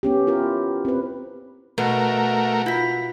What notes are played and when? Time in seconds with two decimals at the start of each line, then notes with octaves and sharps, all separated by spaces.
0.03 B3 C#4 G4
0.27 E4 F4 A#4
0.85 C4 B4
1.78 B2 G#3 A3 A#4 F#5
2.66 E4 F4 B6